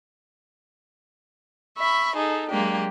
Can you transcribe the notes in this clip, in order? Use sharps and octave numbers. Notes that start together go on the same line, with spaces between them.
E5 B5 C#6
D#4 G#4 A4
F#3 G#3 A#3 D4 G4